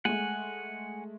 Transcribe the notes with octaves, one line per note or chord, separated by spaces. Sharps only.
G#3 A3 F#5 G#5